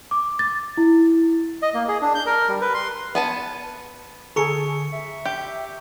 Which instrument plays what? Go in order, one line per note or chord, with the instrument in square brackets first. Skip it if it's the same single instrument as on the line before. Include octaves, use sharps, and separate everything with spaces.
[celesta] D6
A6
E4
[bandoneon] D#5
A#3
G#4
D4
G6
A#4
G3
B4
C6
[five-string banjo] B3 G#5 A5
[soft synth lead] D3 [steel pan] G#4 A4 [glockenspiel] A#5 C#6 C#7
[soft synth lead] E5
[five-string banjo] G4